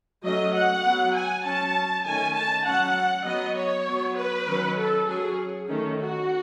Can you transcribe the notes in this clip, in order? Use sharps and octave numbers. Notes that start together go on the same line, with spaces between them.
F#3 A3 C#4 D#5
F#5
B3
F#3
G#5
F#3 C#4 A5
D#3 A3 C#4 G#5
A5
F#3 C#4 F#5
F#3 B3 D#5
C#5
F#3 B3
B4
D#3 F#3 C#4
A4
F#3 C#4 G#4
D#3 A3 C#4
F#4